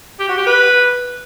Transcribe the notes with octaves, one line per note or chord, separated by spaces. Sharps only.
G4
F#4
G4
B4